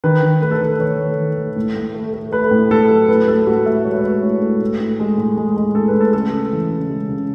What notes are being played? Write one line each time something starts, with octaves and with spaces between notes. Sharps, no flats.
D#3 B4
D#3
A3 B4
A4
D#3 B4
D#3 C#5
A3
D#3
A3
A2
A2
A3
A3
A3 B4
A2
A2 A4
F#3
A2 B4
A2 A4
A2 F#4
A2 E5
G#3 C#5
B4
G#3 C#5
A2
A2
A2
A2
G#3
A2
G#3
G#3
A2 A4
B4
A2
A4
C#3 A4
C#3
E3
C#3
G#3
C#3